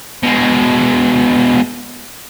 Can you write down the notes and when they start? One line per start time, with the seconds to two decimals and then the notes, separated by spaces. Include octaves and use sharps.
0.23 B2 G#3